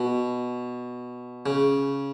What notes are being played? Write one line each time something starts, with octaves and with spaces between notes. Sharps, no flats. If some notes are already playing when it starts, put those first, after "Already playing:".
Already playing: B2
C#3